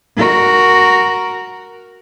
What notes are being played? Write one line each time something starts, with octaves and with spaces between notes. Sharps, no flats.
F#4 A#4